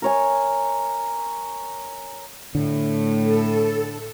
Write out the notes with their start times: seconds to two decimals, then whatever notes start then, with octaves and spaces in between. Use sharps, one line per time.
0.02 A#4 C#5 G#5
2.55 A2 D3
3.23 A4